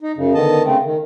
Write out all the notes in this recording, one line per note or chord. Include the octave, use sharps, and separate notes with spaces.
D#4
F#2 C#3
D3 D#3 B3 D#5 A5
C#3 A3 C4
D#3